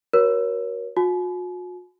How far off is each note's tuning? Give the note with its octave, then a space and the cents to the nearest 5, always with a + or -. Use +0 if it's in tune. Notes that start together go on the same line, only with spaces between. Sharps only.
F#4 +5 A#4 +30 C#5 +0
F#4 -45 G#5 +45